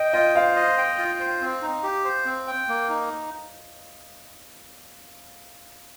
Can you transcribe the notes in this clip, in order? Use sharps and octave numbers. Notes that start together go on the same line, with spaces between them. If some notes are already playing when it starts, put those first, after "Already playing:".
Already playing: D#5 G5
F4 D#5
C5 F5
D#5
G5
F4
C5
C4
D#4
G4
C5
C4
G5
A#3
D#4